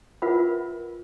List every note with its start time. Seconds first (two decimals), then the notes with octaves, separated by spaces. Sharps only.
0.22 F4 A#4 B4 E5 F#5 B5